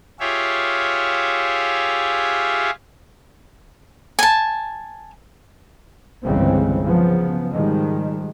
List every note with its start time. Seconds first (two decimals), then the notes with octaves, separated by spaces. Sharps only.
0.20 F4 G4 G#4 C#5 E5 F5
4.19 G#5 A5
6.24 G1 C2 C#3 E3 G#3 C4
6.85 C#3 F3 F#3 B3
7.51 G#2 D#3 F3 G3 G#3